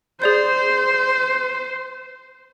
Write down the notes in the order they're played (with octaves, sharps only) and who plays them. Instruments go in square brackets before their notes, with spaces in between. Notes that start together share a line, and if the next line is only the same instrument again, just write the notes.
[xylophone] G#4 D5 G6 [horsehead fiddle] C5